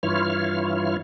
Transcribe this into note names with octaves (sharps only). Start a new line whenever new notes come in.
G2 E3 E4 F4 C#5 F6